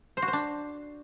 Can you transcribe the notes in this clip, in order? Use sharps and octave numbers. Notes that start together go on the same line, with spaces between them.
C5
F#4
C5
D4